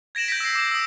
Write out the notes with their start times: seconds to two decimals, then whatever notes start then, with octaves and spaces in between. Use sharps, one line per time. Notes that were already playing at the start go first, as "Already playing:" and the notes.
0.15 G#6 A#6 D7 E7 F#7
0.28 G6 A#6 B6
0.40 E6 C7
0.55 D6 E7
0.71 D#6 E6